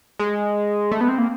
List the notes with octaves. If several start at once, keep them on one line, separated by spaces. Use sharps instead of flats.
G#3
A3
B3
C4
A#3